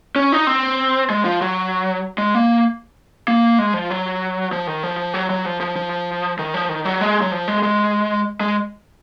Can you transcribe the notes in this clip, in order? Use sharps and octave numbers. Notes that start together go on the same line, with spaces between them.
C#4
D#4
C4
G#3
F3
F#3
G#3
A#3
A#3
G#3
F3
F#3
F3
D#3
F3
F#3
F#3
F3
F3
F3
D#3
F3
D#3
F#3
G#3
F#3
F3
G#3
G#3
G#3